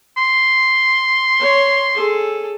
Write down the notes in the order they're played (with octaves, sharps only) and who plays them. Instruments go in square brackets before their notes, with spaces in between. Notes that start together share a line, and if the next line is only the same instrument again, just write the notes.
[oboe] C6
[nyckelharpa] C#5
G#4 A4